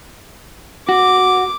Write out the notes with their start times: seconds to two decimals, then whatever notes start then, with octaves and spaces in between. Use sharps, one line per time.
0.89 F#4 D6